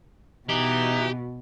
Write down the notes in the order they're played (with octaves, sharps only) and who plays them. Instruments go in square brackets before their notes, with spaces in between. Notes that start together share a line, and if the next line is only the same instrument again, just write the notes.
[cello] B2 [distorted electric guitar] E3 [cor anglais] D#4 [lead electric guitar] G4